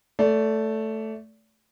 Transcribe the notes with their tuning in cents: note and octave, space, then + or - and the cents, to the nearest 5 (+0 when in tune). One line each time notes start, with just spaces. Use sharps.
A3 +0 D5 -35